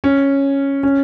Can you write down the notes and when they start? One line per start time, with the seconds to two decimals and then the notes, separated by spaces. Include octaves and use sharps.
0.04 C#4
0.83 C#4